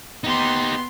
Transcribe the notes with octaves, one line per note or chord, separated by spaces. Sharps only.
B3 D#4 G4 C6